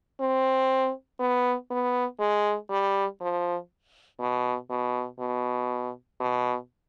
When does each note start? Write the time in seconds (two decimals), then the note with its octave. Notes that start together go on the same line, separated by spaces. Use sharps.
0.20 C4
1.20 B3
1.70 B3
2.20 G#3
2.71 G3
3.21 F3
4.20 B2
4.70 B2
5.20 B2
6.20 B2